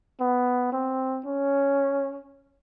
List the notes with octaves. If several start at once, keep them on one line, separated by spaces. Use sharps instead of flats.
B3
C4
C#4